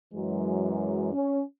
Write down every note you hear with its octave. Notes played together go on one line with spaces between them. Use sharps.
F#2 E3 F#3 G#3
C#4